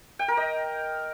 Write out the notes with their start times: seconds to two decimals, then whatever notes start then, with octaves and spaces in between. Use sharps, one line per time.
0.19 G5
0.28 A#4
0.37 D#5